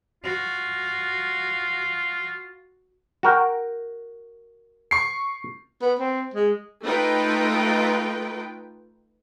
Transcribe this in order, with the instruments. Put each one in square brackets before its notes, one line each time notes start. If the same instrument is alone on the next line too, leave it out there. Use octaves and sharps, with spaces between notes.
[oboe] F4 [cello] F#4
[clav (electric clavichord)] F#4 A#4 G5
[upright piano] C#6 C7
[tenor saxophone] B3
C4
G#3
[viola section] A3 D#4 F4 B4 G5